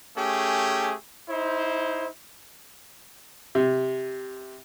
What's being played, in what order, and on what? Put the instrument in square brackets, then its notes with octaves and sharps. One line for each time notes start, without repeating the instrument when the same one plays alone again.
[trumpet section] A3 C#4 G4 G#4
D#4 E4 C5
[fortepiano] C3